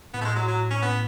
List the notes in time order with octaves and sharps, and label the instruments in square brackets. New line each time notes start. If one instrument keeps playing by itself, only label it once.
[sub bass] A2 [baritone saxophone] B3
[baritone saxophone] A3
G#3
F#3
F#3
C#4
B3